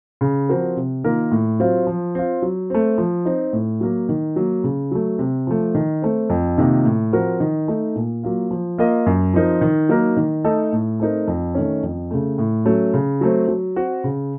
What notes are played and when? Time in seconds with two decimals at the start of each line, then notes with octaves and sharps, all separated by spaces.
0.21 C#3
0.49 F3 C4 F#4 A#4
0.77 C3
1.04 D#3 A#3 F4 A#4
1.31 A2
1.60 F#3 C4 F4
1.87 F3
2.15 C4 F4
2.42 F#3
2.70 A3 C4
2.98 F3
3.25 C4 D#4
3.53 A2
3.81 F#3 A#3
4.09 D#3
4.36 F#3 A#3
4.64 C#3
4.91 F#3 A3
5.19 C3
5.47 F3 A3
5.75 D#3
6.02 A3 C4
6.30 F2
6.57 C3 D#3 A#3 F4
6.85 A2
7.13 F3 C4 F#4 A#4
7.40 D#3
7.68 A3 D#4
7.95 A#2
8.23 F#3 A#3 F4
8.51 F3
8.78 A#3 F4 A#4 D#5
9.06 F#2
9.34 F3 C4 D#4 A#4
9.61 D#3
9.89 F#3 A#3 D#4 A#4
10.17 D#3
10.44 A3 D#4 A4 D#5
10.73 A2
11.00 A3 C4 D#4 A#4
11.27 F2
11.55 D#3 A3 C#4
11.83 F2
12.11 C#3 A3
12.38 A2
12.65 F#3 A3 C#4
12.94 C#3
13.21 F#3 A3 C4
13.48 F#3
13.76 C4 F#4
14.04 C#3